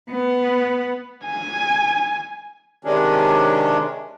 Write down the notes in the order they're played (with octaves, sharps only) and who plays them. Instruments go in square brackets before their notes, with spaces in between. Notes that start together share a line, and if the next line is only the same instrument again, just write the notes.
[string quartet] B3
[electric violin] G#5
[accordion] C3 D#3 G#3 C#4 D4